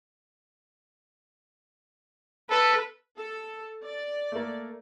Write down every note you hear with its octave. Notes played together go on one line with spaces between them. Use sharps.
A4 B4
A4
D5
A3 A#3